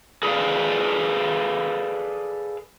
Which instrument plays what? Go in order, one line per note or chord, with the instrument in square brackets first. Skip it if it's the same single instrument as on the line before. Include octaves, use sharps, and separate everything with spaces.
[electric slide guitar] G#4 A4 B4 C5 D5 F5